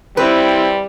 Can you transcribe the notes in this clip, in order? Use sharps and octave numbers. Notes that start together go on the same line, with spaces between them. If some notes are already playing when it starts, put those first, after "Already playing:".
G3 C4 E4 B4